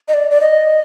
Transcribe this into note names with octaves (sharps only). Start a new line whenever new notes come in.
D#5
D5
D5
D#5